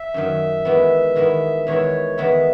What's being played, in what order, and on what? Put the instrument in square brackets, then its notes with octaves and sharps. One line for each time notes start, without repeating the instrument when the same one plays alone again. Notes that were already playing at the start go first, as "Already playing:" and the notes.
Already playing: [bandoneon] E5
[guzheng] F#2 D#3 F#3
E2 D#3 G#3 B3 E4
E2 D#3 G#3 B3 E4
[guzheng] E2 D#3 G#3 B3 E4 [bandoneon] C#5
[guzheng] E2 D#3 G#3 B3 E4 [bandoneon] E5